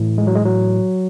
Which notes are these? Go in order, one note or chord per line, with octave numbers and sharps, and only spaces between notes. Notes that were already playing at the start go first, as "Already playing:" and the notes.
Already playing: A2 E3
G#3
F#3
G#3
F#3